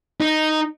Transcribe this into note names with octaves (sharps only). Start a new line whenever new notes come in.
D#4